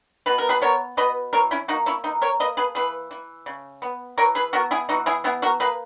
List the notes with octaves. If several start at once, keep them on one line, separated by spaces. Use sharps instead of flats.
B2 B4
A#4
G#4 B4
B3 A#4 C#5
B2 B4 D#5
E3 A#4 C#5
C#4 E4
A#3 D#4 F#4
C#4 E4
E3 D#4
A#4 C#5
A#3 B4 D#5
G#4 B4
E3 G#4 B4
E3
C#3
B3
E3 A#4 C#5
G#4 B4
B3 F#4 A#4
E4 G#4
E3 D#4 F#4
E4 G#4
B3 E4 G#4
F#4 A#4
A#3 G#4 B4